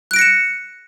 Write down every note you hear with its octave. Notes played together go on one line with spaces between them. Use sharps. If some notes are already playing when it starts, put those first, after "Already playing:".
F#6 A#6 C#7 D7 E7